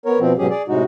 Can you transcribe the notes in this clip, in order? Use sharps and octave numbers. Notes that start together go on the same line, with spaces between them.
B3 A#4 C#5
B2 F3 C4
G#2 B2 F#3 C#4 G4 G#4
G#4 D5
A2 C3 G#3 D#4 F#4